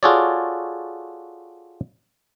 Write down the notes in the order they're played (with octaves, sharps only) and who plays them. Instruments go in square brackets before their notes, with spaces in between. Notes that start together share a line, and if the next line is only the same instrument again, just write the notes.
[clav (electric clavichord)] F4 F#4 G#4 A4 C#5 D5